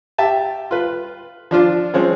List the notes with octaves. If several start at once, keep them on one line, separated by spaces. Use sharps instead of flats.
G4 E5 A5
F4 B4
F3 D4 F4
F3 G#3 C4 C#4